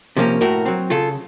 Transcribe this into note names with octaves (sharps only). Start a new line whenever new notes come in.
C3 F3 A#3 C#4
A2 F#4 A#4
F#3 C4
C#3 F4 A4